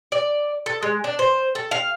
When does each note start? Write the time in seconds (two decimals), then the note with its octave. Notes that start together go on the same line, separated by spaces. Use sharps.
0.12 D5
0.66 A4
0.83 G#3
1.04 D4
1.19 C5
1.55 A4
1.71 F5